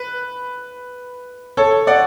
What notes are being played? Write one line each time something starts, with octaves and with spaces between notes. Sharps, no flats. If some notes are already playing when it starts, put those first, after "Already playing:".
Already playing: B4
A4 C#5
D5 F#5